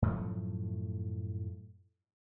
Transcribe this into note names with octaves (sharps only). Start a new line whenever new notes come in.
F#2 A2 F3 A3